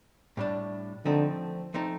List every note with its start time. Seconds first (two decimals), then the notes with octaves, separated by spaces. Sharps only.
0.37 A2 G3 D4
1.05 D3 F3 A3 C4 D#4
1.74 F3 A3 C4 D#4